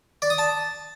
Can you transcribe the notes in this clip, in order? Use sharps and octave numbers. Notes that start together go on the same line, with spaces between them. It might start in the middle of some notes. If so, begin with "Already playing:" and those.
D5
D#6
A5